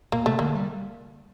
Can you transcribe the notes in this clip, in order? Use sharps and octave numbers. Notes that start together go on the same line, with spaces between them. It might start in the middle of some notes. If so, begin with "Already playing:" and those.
A#2 A#3
C3 A3
D3 A#3
G3